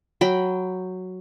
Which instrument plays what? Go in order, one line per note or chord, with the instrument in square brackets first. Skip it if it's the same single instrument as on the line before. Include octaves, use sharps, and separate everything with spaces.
[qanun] F#3 G5 B5